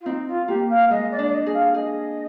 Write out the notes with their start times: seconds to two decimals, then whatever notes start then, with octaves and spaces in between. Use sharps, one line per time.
0.01 F4
0.06 C4 D#4
0.27 F4
0.48 A#3 G4
0.69 F5
0.90 G#3 D#5
1.11 D5
1.18 D4
1.25 D5
1.32 D#5
1.46 G#4
1.53 F5
1.74 G#4 D#5